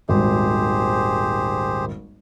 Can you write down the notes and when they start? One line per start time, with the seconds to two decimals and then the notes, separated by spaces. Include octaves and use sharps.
0.09 D#1 G#1 G4 G#4 C5